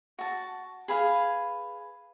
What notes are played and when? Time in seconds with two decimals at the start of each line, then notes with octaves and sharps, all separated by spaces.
0.19 F#4 A5
0.88 G#4 B4 F5 G#5